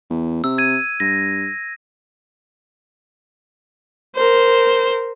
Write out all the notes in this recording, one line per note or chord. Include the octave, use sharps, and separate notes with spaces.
E2
C3 E6
G#6 D#7
G2 A#6
A#4 C5